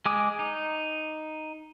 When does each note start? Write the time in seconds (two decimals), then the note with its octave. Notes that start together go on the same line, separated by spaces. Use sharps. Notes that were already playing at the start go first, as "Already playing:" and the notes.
0.06 G#3 G#5 D6 D#6
0.39 D#4